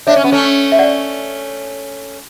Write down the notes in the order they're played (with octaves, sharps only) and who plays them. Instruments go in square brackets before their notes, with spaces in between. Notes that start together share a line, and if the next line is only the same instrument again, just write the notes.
[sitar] D4 [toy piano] C#5 E5
[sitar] C#4
B3
A3 C#4
[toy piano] E5
D5 F#5